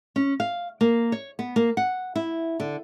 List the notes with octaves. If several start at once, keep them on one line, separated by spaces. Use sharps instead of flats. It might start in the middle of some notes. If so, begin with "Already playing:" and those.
C#4
F5
A#3
C#5
B3
A#3
F#5
E4
D3